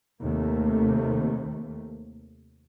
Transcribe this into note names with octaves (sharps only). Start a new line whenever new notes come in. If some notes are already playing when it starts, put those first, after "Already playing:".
D#2 C3 A3 A#3